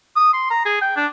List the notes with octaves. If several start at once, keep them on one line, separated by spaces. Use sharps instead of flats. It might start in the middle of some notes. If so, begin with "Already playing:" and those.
D#6
C6
A#5
G#4
G5
D4